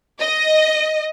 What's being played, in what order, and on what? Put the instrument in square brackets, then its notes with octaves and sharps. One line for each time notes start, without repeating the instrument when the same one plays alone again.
[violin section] D#5